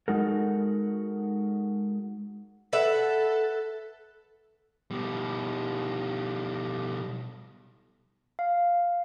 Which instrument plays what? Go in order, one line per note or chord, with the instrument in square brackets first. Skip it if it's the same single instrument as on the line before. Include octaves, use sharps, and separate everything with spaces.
[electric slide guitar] G#3 D#4 F#4 A4 A#4
[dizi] A4 [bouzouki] B4 E5 F#5
[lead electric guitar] B2 G3
[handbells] F5